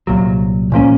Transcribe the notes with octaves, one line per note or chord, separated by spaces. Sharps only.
C2 A#2 F#3
A#2 F3 A#3 C#4